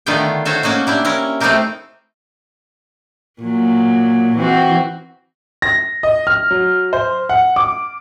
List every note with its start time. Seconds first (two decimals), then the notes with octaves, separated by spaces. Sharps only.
0.06 D3 D#3 A3 B3 F4 G5
0.45 F4 F#4 A4 C5 C#5 E5
0.63 A#3 C#4 D#4 F#4
0.87 D4 E4 G4
1.05 C#4 E4 A#4
1.40 A3 C4 D#4 E4 G4 A#4
3.41 A#2 F#3
4.36 E3 C4 F#4
5.62 A#6
6.03 D#5
6.27 F6
6.51 F#3
6.93 C5
7.29 F#5
7.56 D6